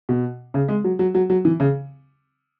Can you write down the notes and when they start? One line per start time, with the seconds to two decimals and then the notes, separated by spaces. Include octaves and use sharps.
0.09 B2
0.54 C#3
0.68 G#3
0.84 F#3
0.99 F#3
1.15 F#3
1.30 F#3
1.45 E3
1.60 C#3